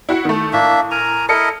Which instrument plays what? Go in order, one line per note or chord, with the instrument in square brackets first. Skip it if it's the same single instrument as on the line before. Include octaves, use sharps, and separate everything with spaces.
[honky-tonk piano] E4 F#4 F#5
D#3 A3
[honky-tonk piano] A2 [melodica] A#3 D4 E5
[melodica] A#4 G#5 A#5
[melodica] E4 A#4 D#5 [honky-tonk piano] A4 C#7